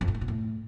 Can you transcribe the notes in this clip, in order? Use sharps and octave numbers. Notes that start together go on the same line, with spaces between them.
F2
A2
G#2
B2
A2